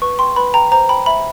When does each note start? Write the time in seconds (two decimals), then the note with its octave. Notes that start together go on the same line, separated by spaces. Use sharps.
0.02 B4 C#6
0.19 G5 C6
0.36 B4 B5
0.54 G5 A#5
0.71 C5 A#5
0.89 G5 B5
1.06 E5 B5